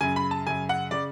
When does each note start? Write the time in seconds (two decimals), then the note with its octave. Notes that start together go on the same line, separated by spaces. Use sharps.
0.01 F#2 C#3 G#5
0.16 B5
0.31 A5
0.47 F#2 C#3 G#5
0.69 F#5
0.91 C#3 D5